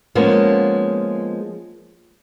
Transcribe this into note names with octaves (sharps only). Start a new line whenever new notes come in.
F3 G#3 A#3 B3 C#4